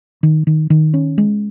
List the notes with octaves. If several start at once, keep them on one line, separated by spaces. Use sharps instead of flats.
D#3
D#3
D#3
C#4
G#3